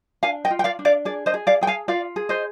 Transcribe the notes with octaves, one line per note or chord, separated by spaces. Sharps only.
D4 F5 G#5
D#5 G5
F4
G5
D5 F5
D4
D5 F5
G#4 D5
C5 D#5
G#4
D5 F5
G#4 G5
F5 G#5
F4 D5 F5
G#4
C5 D#5